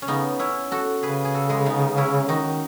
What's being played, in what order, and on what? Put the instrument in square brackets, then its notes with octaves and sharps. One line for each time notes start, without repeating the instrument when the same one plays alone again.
[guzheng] C#4
[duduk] C#3 [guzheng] B3 D#4
[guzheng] C#4 E4
F#4 A4
[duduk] C#3 [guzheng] G#4 B4
[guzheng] G#4
F#4 A4
G#3 B3
B3 D#4
C#4 E4
[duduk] D#3 [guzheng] D#4 F#4